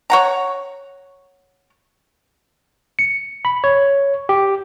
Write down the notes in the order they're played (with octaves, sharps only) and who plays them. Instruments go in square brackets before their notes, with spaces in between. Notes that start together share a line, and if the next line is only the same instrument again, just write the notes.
[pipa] C#5 F#5 A#5
[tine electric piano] C#7
B5
C#5
G4